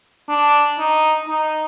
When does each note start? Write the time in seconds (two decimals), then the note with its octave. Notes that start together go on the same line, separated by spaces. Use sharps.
0.29 D4
0.79 D#4
1.28 D#4